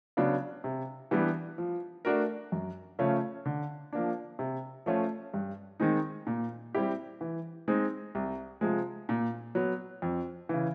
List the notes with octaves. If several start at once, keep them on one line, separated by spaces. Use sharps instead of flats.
C#3 F#3 B3 D4
C3
E3 G3 B3 D4
F3
A3 D4 F#4 A#4
F#2
C#3 F3 A3 C#4
D3
F3 A#3 D4
C3
F3 A3 C#4 F4
G2
D#3 G#3 C4 D#4
A#2
G3 C4 E4 G4
E3
G#3 C4 D#4
C2
C3 F3 G#3
A#2
F#3 B3
F2
C#3 E3